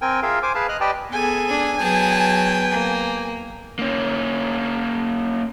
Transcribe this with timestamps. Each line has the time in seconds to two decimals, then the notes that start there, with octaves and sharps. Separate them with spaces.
0.02 C4 A#4 G5 G#5
0.23 F4 G#4 A#4 E5 F5
0.43 C5 G#5 D6
0.55 G#4 B4 F5 A5
0.69 D#5 F6 F#6
0.81 G4 B4 D5 D#5 G5 A5
1.12 B3 G#4 A4 G#5
1.49 D4
1.80 F#3 B3 G#4 G5 A5
2.71 A#3
3.79 A#3 C#4